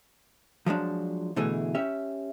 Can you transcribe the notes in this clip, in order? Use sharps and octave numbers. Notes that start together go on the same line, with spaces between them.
F3 F#3 G#3 D4
B2 D3 E3 A3 G#4
C#4 G4 E5